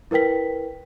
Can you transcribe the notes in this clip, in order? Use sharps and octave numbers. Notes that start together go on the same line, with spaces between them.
E4 A#4 B4 G5 B6